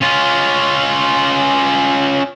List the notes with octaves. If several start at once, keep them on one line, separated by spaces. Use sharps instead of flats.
C#4 F4